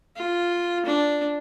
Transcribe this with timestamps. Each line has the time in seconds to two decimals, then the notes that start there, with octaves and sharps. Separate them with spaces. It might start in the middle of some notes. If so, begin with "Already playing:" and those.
0.16 F4
0.86 D4